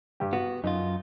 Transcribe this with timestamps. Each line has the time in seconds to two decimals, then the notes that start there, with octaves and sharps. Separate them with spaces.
0.20 G2 G4
0.33 B3 F#4
0.64 F#2 D#4 F4